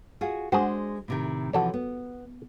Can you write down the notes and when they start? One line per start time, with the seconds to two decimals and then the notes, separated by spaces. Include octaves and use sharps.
0.21 F4 F#4 G#4
0.52 G#3 D4 F#4 G#4 C5
1.08 A2 C3 D#3
1.53 C3 E3 F3 F#4 A4 C#5
1.74 B3